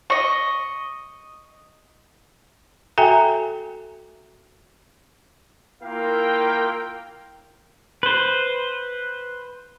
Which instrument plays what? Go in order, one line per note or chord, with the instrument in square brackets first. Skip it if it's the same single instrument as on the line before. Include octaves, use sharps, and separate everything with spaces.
[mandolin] D#5 C#6
[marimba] F#4 A4 E5 G5 G#5 A#5
[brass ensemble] A#3 E4 F4 A#4 F5 G5
[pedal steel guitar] B4 C5